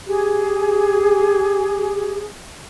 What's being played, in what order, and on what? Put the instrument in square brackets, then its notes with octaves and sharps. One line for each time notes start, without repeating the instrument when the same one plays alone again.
[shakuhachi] G4 [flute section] G#4